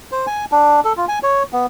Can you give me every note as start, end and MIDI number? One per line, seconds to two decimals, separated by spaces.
0.12 0.26 72
0.27 0.45 80
0.52 0.80 62
0.85 0.93 69
0.97 1.05 65
1.08 1.19 80
1.23 1.43 73
1.53 1.66 59